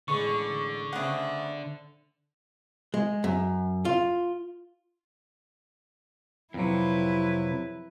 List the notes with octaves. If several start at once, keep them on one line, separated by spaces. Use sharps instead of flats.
A1 D3 G#3 B3 C#6
C#3 A3 B3 C4 F#5
G#3
F#2
F4
F2 C3 F#3 E4 B4